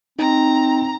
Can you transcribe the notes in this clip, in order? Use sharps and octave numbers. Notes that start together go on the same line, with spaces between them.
C4 D#4 A#5